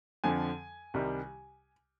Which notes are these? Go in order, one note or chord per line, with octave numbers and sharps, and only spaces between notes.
F2 D3 F3 G#5
C2 C3 D#3 G3